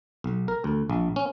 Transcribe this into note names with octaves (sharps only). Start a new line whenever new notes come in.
B1
A#4
D2
A#1
C#4